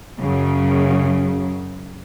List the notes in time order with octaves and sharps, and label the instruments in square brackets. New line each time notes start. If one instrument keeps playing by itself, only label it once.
[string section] F#2 C#3